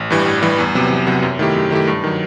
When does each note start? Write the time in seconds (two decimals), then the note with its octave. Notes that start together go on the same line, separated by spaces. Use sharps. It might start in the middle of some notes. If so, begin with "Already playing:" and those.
Already playing: A1
0.10 G2 E3 G3
0.26 A1
0.42 G2 E3 G3
0.58 E2
0.75 C3 F#3 B3
0.90 E2
1.07 C3 F#3 B3
1.22 F#2
1.39 D#3 A3 E4 G4
1.55 F#2
1.71 D#3 A3 E4 G4
1.87 G2
2.04 D#3 F#3